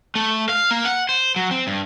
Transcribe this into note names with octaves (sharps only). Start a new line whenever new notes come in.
A3
F5
A#3
F#5
C5
F#3
C4
G2